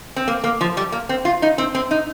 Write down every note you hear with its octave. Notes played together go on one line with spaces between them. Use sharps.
C4
A#3
A#3
F3
G3
A#3
C4
F4
D#4
C4
C4
D#4